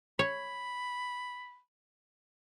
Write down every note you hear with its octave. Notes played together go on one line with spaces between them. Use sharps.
C#5 B5